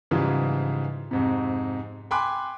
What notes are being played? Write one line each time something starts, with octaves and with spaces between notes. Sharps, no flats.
G#2 C#3 E3 F3 G3
F2 G#2 C3
G5 G#5 B5 C6 D6 F#6